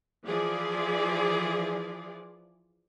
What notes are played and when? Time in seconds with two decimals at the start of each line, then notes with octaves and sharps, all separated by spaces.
0.25 E3 F3 G#4 D5